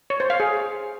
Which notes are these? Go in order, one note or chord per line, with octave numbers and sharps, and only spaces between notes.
C#5
C5
F5
G#4